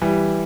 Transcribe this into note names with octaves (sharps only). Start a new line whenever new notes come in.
E3 G3